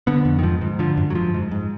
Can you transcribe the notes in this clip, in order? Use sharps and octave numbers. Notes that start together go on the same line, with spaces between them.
D3 B3
F2
D#3
G#2 F3
G#2
D3 F3
F#2
F#3
G#2 F3
G#2
G#2